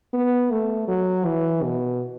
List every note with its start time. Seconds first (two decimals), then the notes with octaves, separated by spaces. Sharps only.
0.13 B3
0.51 A3
0.88 F#3
1.25 E3
1.64 B2